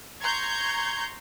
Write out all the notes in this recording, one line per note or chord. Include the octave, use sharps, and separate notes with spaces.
A#5 C6 C#6 G6 G#6